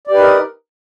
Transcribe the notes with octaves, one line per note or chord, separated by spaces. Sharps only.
D#4 G4 A#4 B4 D5